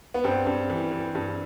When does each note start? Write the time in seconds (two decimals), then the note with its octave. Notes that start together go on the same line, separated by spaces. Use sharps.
0.14 B3
0.24 G2 C4
0.47 G2
0.70 E3
0.91 E3
1.15 G2